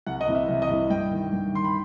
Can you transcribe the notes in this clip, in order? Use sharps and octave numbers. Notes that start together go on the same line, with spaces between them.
C2 F#5
D#5
C3 E3
E5
C2
D#5
C3 E3
G2 G5
D#3
G2
D#3 C6
B5